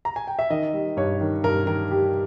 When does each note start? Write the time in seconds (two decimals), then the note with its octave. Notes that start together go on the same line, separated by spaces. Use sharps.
0.05 A#5
0.16 G#5
0.27 G5
0.39 E5
0.50 D#3 D#5
0.73 G3
0.97 G2 C#5
1.21 D#3
1.44 G2 A#4
1.67 D#3 A#4
1.91 G3 G4